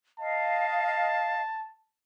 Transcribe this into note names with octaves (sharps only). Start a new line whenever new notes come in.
D#5 F5 A5